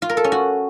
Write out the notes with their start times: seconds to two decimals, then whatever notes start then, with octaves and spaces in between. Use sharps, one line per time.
0.02 F4
0.09 A#4
0.17 A4
0.24 C#4
0.32 F#4